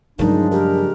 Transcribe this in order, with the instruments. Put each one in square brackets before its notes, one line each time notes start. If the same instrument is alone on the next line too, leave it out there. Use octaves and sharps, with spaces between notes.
[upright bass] G2 F#3 [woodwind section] A#2 D4 [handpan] C#3 F3 G#3 [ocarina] D#4
[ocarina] G4 [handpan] A#4